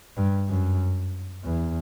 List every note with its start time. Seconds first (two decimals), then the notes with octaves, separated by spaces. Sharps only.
0.17 G2
0.49 F#2
1.44 E2